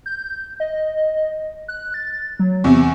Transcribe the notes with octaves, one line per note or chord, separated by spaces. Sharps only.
G6
D#5
F#6
A6
F#3
E2 C3 C#6